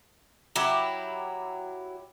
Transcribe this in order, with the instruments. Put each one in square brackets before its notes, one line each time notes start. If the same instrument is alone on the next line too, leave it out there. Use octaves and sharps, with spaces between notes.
[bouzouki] F#3 E4 G4